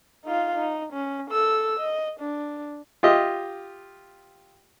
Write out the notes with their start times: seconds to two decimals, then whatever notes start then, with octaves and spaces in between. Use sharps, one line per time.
0.25 D#4 F4
0.55 D#4
0.93 C#4
1.31 A4 E6
1.80 D#5
2.20 D4
3.03 F4 G4 D#5 E5